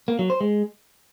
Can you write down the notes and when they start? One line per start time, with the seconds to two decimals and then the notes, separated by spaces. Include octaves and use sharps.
0.08 A#3
0.19 F#3
0.30 C5
0.41 G#3